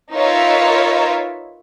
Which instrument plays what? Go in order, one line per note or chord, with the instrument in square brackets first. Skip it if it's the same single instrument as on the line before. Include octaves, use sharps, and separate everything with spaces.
[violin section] D#4 F4 A#4 B4 C#5 E5